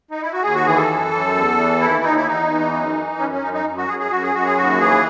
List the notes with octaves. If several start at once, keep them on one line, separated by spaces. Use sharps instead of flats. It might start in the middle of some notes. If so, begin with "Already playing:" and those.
D#4
E4
F#4
D#2 G#4
F#4
E3 G#4
A4
F#2
F#2
E2
E3
D#2 E4
D#2 D#4
E4
E2 D#4
E3
F#2
E3
F#2 C#4
C#4
F#2 D#4
D#4
F#2
F#4
F#2 G#4
G#4
F#2 F#4
G#4
F#2 F#4
G#4
D#2 F#4
E3 G#4